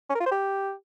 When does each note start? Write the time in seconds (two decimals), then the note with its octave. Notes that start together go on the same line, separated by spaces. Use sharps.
0.09 C#4
0.15 A#4
0.20 F4
0.26 C5
0.31 G4